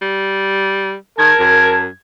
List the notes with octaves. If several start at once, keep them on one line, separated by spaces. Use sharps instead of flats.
G3
D#3 A#4 A5 G#6
F#2